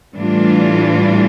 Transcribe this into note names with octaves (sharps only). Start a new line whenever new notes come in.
A2 E3 G3 D4 F4